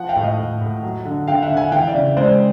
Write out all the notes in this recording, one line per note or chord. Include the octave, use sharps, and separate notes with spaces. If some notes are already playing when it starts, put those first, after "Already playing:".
Already playing: F3 F#5
F5 G5
A2
D#5 F5
A2
A2
F#3
D3
D3 F5 G5
E5 F#5
D3
F#5 G#5
E3 F5 G5
D5 E5
C#3
G#3 C5 D5